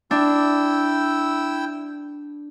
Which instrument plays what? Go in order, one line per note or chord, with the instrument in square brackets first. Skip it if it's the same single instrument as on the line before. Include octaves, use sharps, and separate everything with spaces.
[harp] D4 [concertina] E4 G5 E6